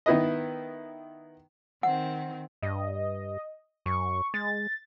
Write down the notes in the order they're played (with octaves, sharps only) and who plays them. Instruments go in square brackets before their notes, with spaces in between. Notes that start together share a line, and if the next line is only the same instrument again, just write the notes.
[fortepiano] D#3 B3 E4 B4 D#5
[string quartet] D#3 C4 [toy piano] F#5
[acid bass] G2 [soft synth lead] D#5
[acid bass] F#2 [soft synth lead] C#6
[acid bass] G#3 [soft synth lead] A6